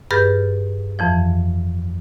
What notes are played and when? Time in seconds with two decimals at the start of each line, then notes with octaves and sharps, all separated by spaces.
0.11 G2 G#4 B4 F6 G6 A6
0.99 F2 E3 F3